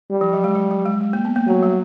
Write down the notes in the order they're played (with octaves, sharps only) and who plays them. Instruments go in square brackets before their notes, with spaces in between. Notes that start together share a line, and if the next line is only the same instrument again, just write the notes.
[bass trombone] G3
[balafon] F3
F#3
G#3
F#3
F#3
G#3
G#3
A#3
B3
A#3
[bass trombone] F#3 [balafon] A3
[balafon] G3